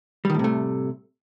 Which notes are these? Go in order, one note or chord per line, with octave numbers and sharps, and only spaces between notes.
A2 C3 D#3 G3 A3